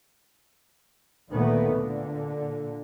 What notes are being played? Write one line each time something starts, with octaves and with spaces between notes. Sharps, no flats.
D2 A#2 D#3 A3 B3
A#2 D3